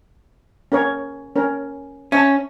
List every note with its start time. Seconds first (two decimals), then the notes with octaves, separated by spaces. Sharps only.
0.72 C#4 A#4 C#5
1.36 C#4 A#4
2.12 C#4 E5 A5